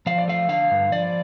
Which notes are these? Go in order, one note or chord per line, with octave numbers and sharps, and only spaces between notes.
F3 F5
D5
A3 F5
D3 F5
G2
F3 D5